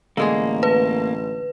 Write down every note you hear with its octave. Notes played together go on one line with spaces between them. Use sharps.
A1 D3 G#3 A#3 G#4
B4